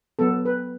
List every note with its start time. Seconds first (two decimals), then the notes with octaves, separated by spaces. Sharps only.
0.19 F#3 B3 A4
0.45 B4